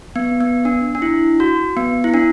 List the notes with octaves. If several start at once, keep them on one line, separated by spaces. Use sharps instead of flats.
B3
B3
D4
D4
E4
F#4
B3
E4
D4